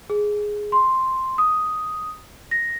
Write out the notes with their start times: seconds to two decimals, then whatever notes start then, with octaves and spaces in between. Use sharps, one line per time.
0.10 G#4
0.72 C6
1.38 D#6
2.51 A#6